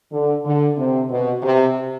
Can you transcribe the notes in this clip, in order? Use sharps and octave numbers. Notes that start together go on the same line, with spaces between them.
D3
D3
C3
B2
C3